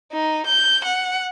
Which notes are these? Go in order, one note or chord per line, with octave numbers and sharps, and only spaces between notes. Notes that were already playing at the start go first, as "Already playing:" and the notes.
D#4
G6
F#5